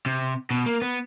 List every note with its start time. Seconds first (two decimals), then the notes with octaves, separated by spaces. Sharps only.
0.06 C3
0.51 B2
0.66 A#3
0.82 B3